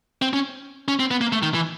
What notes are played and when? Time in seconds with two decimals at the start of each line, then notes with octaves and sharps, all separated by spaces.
0.22 C4
0.33 C#4
0.88 C#4
0.99 C4
1.11 B3
1.21 A#3
1.32 A3
1.43 D#3
1.54 E3